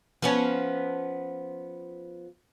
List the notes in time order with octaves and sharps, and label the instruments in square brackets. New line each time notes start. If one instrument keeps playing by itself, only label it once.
[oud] F3 B3 C#4